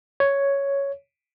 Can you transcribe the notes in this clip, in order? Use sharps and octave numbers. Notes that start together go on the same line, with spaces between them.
C#5